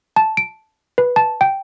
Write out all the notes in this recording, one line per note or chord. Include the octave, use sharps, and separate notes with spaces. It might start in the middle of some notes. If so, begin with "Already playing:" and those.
A5
D7
B4
A5
G5